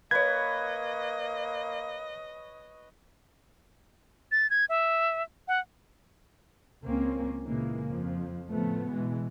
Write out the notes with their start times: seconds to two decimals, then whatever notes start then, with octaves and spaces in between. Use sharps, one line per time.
0.11 A#3 B4 C#5 D#5 G#6
4.32 A6
4.50 G#6
4.69 E5
5.48 F#5
6.84 C#2 A#3 C4 C#4
7.45 A#2 C#3 E3 G#3 A#3
7.89 F2 F3
8.49 A2 C#3 F3 A3 B3
8.92 B2 E3 G#3